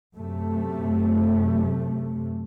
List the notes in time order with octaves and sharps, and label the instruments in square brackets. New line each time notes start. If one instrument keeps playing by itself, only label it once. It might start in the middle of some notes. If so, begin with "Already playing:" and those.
[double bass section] F#2 C3 A3